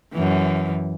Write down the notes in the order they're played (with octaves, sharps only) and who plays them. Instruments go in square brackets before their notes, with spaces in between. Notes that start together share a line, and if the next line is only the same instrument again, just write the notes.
[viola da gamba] F#2 E3